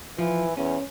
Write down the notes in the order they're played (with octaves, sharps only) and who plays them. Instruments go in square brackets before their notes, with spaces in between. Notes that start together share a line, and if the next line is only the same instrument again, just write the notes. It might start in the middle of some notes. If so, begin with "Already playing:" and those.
[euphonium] E3 [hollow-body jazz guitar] F3
[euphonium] E2 [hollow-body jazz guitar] C#4